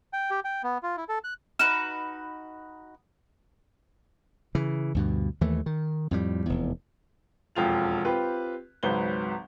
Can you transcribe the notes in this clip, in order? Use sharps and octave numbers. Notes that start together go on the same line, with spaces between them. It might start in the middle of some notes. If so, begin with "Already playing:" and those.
G5
G4
G5
B3
F4
E4
A4
F#6
D#4 F#4 B4 F6 E7
C#3 E3
D2 G2 B2
D#2 E3 A3
D#3
F2 A2 G3
F1 E2
E1 F2 F4 F7
C4 F4 G4 B4
G#1 C#2 F#3 B4 C5 G7